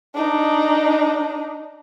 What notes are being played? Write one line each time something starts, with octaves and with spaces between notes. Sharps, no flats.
D4 D#4